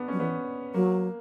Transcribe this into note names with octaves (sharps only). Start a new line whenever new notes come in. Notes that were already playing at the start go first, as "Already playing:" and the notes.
Already playing: B3 D4
F#3 C#4
E3 B3
F#3 A#3